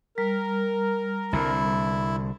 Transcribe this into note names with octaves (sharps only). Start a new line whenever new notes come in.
G3 A#4
C2 D3 E4